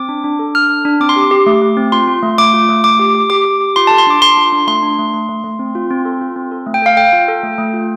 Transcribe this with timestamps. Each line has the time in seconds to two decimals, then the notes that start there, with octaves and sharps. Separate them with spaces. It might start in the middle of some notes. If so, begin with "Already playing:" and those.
Already playing: C4 D6
0.09 D4
0.24 D4
0.39 A4
0.55 D4 F6
0.70 D4
0.85 D4
1.00 C4 D6
1.09 C6
1.16 G4 D6
1.31 G4
1.46 A3
1.62 A3
1.77 C4
1.92 F4 C6
2.07 F4
2.23 A3
2.38 A3 D6
2.53 F4
2.69 A3
2.84 A3 D6
2.99 G4
3.15 G4
3.30 G4 D6
3.45 G4
3.61 G4
3.76 F4 C6
3.87 A4 A5
3.98 C6
4.07 D4 D6
4.22 A4 C6
4.37 F4
4.52 D4
4.67 A3 C6
4.83 D4
4.99 A3
5.14 A3
5.29 A3
5.44 A3
5.59 C4
5.75 F4
5.90 C4
6.05 A4
6.21 F4
6.36 C4
6.51 A4
6.66 A3
6.74 G5
6.82 A4 F5
6.97 A4 G5
7.13 F4
7.28 A4
7.43 A3
7.58 A3
7.73 F4